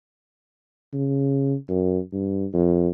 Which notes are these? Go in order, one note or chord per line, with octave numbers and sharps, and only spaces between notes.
C#3
F#2
G2
F2